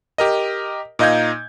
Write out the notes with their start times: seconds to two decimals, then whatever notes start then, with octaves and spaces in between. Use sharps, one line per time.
0.18 G4 A#4 D#5
0.99 A#2 D#4 D#5 F5 G6 G#6